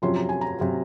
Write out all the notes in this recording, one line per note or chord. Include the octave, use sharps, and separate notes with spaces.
F2 C3 F#3 C#4 C6
A#5
G#5
A#5
C3 F#3 C#4